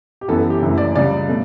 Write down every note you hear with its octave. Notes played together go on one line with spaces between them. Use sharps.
G4
F#2 E3 B3 A4
A4
G4
F#1 F#2 E3 A3
D5
C#2 C#3 G3 D5
B2 A3